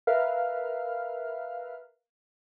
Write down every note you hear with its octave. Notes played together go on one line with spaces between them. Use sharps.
A#4 B4 E5 F5 F6